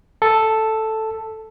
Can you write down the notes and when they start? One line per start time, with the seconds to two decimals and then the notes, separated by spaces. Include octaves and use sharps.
0.22 A4